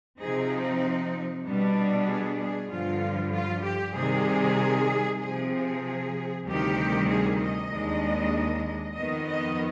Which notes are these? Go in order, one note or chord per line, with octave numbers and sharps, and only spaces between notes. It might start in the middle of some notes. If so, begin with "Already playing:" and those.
C3 F3 C4 D#4 G#4
B2 G3 B3 D4
G#4
G#4
G2 D3 F3 F4
F4
G4
C3 D#3 G3 G#4
C3 F3 C4 G#4
G#4
D2 C3 D#3 G3 G4
G#4
D#5
D#2 D#3 G#3 D4
F2 D#3 B3 D#5
D#5